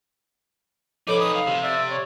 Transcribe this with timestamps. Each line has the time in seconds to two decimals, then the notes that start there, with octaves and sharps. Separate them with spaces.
1.07 F3 D#4 A4 B4 C#5 D6
1.20 D#6
1.35 F5
1.47 C3
1.63 D5 E5
1.90 C#5